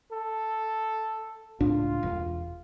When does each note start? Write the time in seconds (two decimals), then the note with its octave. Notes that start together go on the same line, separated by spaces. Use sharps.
0.12 A4
1.60 C#2 A2 D4 F4
2.03 E1